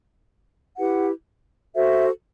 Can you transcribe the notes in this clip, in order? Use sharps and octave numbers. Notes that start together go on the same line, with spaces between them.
E4 G4 B4 F#5
F#4 A4 C5 E5